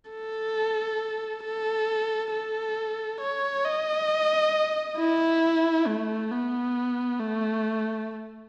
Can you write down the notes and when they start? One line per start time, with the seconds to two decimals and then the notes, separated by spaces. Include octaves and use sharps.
0.11 A4
1.44 A4
2.32 A4
3.21 C#5
3.65 D#5
4.98 E4
5.87 A3
6.31 B3
7.19 A3